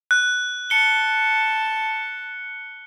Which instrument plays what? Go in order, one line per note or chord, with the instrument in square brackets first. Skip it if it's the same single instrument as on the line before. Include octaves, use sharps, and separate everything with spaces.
[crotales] F#6
[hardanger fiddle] A5 [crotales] C#7 G7